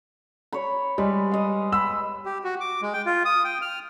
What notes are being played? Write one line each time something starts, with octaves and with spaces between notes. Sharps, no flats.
C#5 B5
G3 G#3 B4
D#5 F5
B5 E6
G4
F#4
D6
G#3
G5
F4
D#6
G5
F6